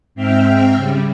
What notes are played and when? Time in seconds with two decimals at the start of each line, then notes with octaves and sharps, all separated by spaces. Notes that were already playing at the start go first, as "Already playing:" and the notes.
0.15 G#2 C4 E5 G5 F6
0.75 C#3 G3